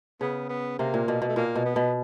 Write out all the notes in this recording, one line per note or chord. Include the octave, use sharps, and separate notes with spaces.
C#3 B3
B3
C3 A#3
A#2
B2
B2
A3
A#2 A#3
B2
B3
B2